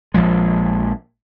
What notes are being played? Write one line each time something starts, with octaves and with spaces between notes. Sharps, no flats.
A#1 F3 G#3